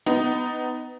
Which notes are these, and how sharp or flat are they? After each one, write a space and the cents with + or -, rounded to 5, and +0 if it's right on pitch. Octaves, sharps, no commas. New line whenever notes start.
B3 +25 D#4 +0